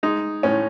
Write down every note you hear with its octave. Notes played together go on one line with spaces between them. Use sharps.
G#3 D#4
A2 C#4